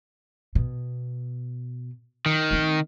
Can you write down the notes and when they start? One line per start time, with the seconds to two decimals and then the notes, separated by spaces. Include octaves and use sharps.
0.55 B2
2.26 D#3
2.51 A3 C4